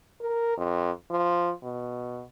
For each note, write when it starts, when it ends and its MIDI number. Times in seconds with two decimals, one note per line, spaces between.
0.21 0.53 70
0.57 0.91 41
1.10 1.51 53
1.63 2.23 47